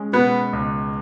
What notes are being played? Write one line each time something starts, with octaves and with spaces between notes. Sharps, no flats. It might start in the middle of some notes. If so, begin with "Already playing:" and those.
Already playing: G#3 C#4
B2 B3
C#2